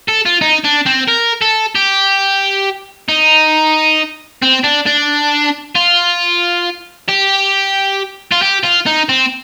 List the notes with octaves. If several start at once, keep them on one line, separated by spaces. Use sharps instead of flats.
A4
F4
D#4
D4
C4
A#4
A4
G4
D#4
C4
D4
D4
F4
G4
F4
G4
F4
D#4
C4